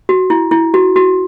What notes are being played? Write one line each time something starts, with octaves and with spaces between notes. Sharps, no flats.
F#4
E4
E4
F#4
F#4